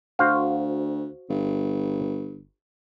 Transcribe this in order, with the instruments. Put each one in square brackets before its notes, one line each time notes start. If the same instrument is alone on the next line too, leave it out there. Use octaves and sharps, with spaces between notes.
[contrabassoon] D2 [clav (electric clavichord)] F#4 C5 F5
[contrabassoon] G1